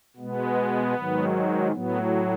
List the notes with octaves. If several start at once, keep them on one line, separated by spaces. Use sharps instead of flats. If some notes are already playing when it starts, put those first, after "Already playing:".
B2 G#3 B3
G#2 D#3 F#3
A2 F#3 B3